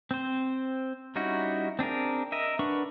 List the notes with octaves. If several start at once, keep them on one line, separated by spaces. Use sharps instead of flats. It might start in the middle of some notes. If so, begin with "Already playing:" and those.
C4 C5
G3 C#4 D#4 E4 F#4
C4 D4 G#4 A#4
A#4 D#5 E5
D4 A#4 B4 F#5 C#6